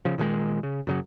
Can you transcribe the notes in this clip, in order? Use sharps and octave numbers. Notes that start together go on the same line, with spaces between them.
C#3 F3
A#2 D#3 E3 G#3
C#3
F#2 C#3 F#3